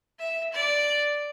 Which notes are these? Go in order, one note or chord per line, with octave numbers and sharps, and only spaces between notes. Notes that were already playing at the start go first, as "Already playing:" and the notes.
E5
D5